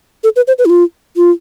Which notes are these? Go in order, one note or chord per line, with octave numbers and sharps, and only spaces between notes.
A4
B4
C5
B4
E4
F4
F4